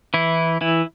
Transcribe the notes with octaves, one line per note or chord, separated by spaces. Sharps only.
E3 E4
E3 E4